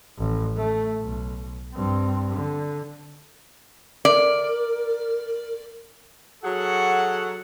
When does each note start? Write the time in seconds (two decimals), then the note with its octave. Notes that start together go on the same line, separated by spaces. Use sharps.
0.18 A1
0.57 A3
1.02 B1
1.73 G2 C4
2.35 D3
4.05 A#4 D5
6.44 F#3 F#4 G#4 A4 F#5